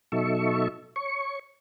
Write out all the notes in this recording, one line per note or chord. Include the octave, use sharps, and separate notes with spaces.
B2 F#3 D#4 A4 E5 C#6
C#5 C#6